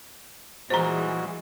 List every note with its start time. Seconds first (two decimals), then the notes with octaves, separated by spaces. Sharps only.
0.70 A#2 E3 G3 G#3 F#4 G#4 C5 A#5